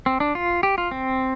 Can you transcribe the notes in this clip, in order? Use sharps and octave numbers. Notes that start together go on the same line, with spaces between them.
C4
D4
F4
G4
F4
C4